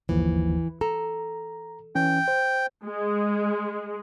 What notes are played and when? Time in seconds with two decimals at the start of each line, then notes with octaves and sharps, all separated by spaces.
0.09 G1 D#2 E3 F3
0.81 A4 A#5
1.95 E3 C#4 G5
2.28 C5
2.86 G#3